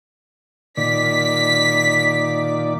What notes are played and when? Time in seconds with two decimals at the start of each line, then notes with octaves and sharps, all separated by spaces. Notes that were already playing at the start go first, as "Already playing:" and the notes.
0.77 A#2 D#3 D5 B6